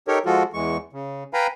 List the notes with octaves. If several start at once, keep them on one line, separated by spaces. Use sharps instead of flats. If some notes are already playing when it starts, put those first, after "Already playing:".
D#4 G4 A4 A#4 C#5
F3 G#3 F4 F#4 A4
E2 E3 G#3 C#6
C#3
B4 F5 G5 G#5 A#5 B5